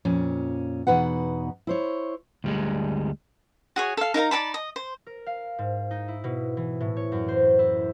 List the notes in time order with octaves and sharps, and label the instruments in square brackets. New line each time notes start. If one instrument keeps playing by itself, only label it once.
[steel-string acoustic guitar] F2 A#2 C#4
E2 B2 D#4 B4 F#5
E4 C5 C#5
[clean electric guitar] D2 G3 G#3
[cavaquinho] F#4 G#4 C#5
A4 F5
D#4 A#4 F5 A#5
D#4 D5 A5 B5
D#5
C5
[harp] A#4
F5
G#2
D#4
E4
B2
E3
A2
C#5
F#2
C5
E4